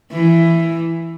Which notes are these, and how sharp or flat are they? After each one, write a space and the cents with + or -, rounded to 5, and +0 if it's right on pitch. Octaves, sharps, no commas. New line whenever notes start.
E3 +10